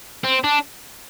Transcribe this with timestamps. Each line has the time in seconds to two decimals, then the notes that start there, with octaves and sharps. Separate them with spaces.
0.24 C4
0.44 D4